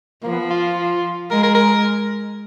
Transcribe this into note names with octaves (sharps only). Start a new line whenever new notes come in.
F3 A#3
B3
F4
G#3 A#4
A#4
A#4